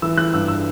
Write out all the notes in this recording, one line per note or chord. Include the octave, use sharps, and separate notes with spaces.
E3 E6
E3 F#6
G2 E6
E6